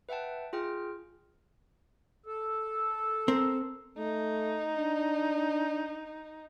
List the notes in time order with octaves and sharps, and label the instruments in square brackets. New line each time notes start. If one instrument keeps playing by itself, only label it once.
[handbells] B4 E5 F#5 G5 A5
F4 G#4 G5 F6
[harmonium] A4
[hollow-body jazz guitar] C4 A#4 C5
[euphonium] A3 [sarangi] D#4
[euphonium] D4